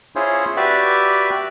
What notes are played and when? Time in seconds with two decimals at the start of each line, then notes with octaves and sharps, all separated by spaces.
0.16 C#4 E4 F4 G#4 C5 C#5
0.57 F#4 G4 B4 D5 E5